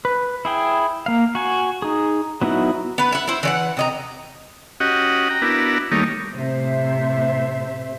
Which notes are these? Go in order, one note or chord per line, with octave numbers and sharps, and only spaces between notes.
B4
E4 G#4 G5
A#3 F5
F#4 G#5
D#4 G#4
F#3 B3 D#4 E4 F#4
B3 B4
E5 F#5
E4 C5
E3 C#5 F#5
C3 D#5 A#5
C#4 F#4 G4 D#5 F#5
G5 A#5
B3 D4 E4 F#4 A#4
D#3 G3 A3 A#3 D#4 C#5
A2 C3 C5 E5